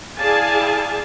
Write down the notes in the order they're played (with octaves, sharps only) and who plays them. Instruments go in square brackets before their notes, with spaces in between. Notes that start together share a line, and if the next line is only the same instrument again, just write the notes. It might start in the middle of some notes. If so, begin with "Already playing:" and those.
[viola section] E4 G#4 D5 F5 G#5 A5